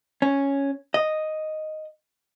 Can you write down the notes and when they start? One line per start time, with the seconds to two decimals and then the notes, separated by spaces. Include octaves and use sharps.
0.22 C#4
0.94 D#5